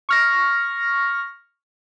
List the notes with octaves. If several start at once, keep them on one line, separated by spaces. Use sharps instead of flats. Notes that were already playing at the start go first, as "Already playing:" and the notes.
C#6 F6 A#6